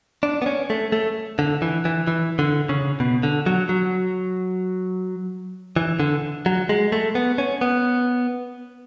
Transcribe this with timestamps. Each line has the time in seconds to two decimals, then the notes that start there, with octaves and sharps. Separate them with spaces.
0.23 D4
0.42 B3
0.46 C#4
0.70 A3
0.92 A3
1.39 D3
1.62 E3
1.85 E3
2.07 E3
2.39 D3
2.69 C#3
3.00 B2
3.23 D3
3.46 F#3
3.69 F#3
5.76 E3
6.00 D3
6.46 F#3
6.69 G#3
6.92 A3
7.15 B3
7.38 C#4
7.61 B3